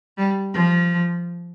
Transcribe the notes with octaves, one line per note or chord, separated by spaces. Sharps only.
G3
F3